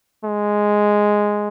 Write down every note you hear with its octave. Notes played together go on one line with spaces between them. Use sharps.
G#3